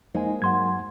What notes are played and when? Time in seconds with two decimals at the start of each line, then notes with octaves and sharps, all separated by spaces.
0.14 G#3 A#3 D#4 C5 D#5 G#5
0.42 G2 F#3 F#5 C6 G#6